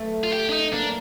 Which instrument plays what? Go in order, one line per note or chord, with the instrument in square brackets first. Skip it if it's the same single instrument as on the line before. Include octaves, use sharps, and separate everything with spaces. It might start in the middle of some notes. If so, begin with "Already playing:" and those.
Already playing: [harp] A3
[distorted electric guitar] F4
G4
D4
D#4
[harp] A#3 [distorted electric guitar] D4